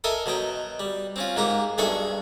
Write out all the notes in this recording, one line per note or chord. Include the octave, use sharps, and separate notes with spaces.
A4 A#4 D#5 E5 G#5
B2 F#3 D#5 G5
G3
C4 C#4 F4
G#2 A#3 G4 A#5
B1 G2 G#4 A4 E5 C#6